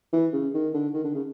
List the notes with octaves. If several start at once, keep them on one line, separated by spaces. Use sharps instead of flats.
E3
C#3
D#3
D3
D#3
D3
C#3